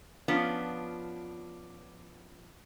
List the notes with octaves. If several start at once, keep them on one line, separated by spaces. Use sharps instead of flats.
F3 B3 C#4 D4 F4